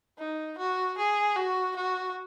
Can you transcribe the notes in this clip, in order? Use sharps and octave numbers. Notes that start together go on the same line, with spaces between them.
D#4
F#4
G#4
F#4
F#4